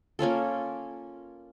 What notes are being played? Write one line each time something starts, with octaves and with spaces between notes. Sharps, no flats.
A#3 C#4 F4 A4